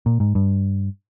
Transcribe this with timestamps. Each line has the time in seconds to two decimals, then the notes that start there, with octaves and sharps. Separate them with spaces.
0.06 A#2
0.20 G#2
0.35 G2